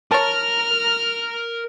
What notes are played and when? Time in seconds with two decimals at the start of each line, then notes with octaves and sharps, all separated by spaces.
0.11 A#4 C#5 A5 A#5 F6